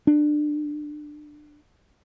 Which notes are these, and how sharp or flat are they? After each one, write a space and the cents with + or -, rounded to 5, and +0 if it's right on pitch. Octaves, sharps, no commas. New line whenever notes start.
D4 +25